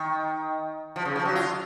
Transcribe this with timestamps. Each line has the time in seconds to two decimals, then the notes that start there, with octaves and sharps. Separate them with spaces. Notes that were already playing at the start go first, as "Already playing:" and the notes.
Already playing: D#3
0.96 F3
1.05 C#3
1.16 F3
1.25 F#3
1.35 F4